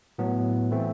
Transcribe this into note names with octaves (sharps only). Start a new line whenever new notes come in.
A2 F#3 B3
E3 A3 C4